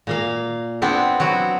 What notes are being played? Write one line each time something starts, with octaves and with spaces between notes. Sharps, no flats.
A#2 A#3 F5
B3 C4 D4 E4
F#3 E4 F#4